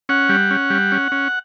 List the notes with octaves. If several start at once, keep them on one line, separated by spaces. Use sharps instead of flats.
C#4 F#5
G3
C#4
G3
C#4
C#4